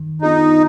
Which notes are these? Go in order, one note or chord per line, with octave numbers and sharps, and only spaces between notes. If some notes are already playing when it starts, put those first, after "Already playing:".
Already playing: D#3
B3 D4 D#4 F4 G#4